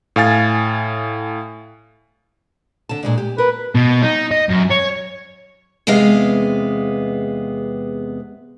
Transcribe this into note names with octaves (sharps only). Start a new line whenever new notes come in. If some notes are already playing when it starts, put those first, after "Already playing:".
A2 F5 G#5 A6
D3 A5
A#2 G#3 D4
G4
A#4 B4
B2
D#4
D#5
F#2
C#5
E2 C3 G#3 B3 F5